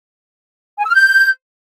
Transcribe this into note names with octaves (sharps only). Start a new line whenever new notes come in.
G#5
E6
F6
G6